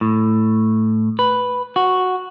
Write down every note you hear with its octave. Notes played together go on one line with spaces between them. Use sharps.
A2
B4
F#4